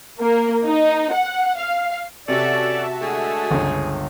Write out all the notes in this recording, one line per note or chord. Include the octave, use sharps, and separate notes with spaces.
A#3
D#4
F#5
F5
C3 C#4 F#4 G4 A4 D5 E5 A5
D3 G#3 A3 G#4
G1 C#2